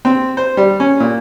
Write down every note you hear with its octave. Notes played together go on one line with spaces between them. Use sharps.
C4
C5
G3
C#4
A#2